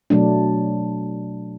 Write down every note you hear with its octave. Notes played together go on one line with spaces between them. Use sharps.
B2 F#3 A3 D4